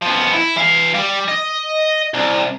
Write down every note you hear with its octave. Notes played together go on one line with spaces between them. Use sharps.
F3 B3
E4
E3 F5
G3
D#5
C2